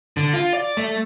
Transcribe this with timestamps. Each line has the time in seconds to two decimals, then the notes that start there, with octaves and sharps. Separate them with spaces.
0.17 D3
0.34 F4
0.53 D5
0.77 A3